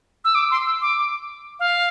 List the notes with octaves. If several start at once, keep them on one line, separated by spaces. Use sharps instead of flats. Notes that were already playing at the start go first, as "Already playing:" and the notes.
E6
D6
C6
E6
D6
F5